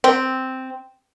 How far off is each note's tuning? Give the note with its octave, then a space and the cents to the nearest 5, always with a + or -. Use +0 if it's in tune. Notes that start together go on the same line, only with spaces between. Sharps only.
C4 -5